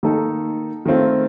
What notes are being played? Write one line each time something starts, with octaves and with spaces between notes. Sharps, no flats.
D#3 A#3 D#4 A4
D#3 A3 C4 F4